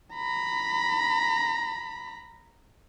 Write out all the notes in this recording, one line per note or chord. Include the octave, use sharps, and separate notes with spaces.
A#5 B5